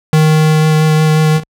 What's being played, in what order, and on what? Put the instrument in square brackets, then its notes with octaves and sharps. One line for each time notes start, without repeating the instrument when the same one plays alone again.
[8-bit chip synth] D#3